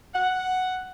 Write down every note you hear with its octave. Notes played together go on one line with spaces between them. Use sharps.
F#5